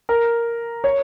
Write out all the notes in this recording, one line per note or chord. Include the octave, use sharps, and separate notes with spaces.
A#4
C#5